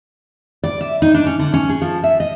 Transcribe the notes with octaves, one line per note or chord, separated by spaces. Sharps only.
D5
E5
D#4
D4
C#4
D3
C#4
G#4
F3
E5
D#5